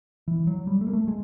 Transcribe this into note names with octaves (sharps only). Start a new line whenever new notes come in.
E3
F#3
G3
A3
A#3
A3
G#3